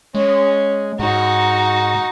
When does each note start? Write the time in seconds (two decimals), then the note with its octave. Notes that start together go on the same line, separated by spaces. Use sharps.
0.15 G#3 C#4
0.99 G#2 D#4 F#4